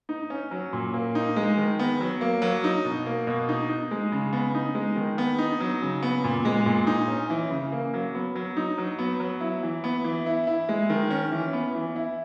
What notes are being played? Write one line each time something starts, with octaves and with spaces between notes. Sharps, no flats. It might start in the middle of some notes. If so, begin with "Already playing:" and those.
D#4
C#4
F#3
A#2
A#3
D#4
G#3
D#3
B3
F#3
A#3
F#3
D#4
B2
A#3
B2
D#4
D#4
G#3
C#3
B3
D#4
G#3
D#3
B3
D#4
F#3
C#3
B3
A#2
G#3
A#2
D#4
C#4
E3
C#3
A#3
F#3
B3
F#3
D#4
F#3
B3
F#3
E4
E3
B3
E3
E4
E4
G#3
D#3
C#4
E3
B3
E3
E4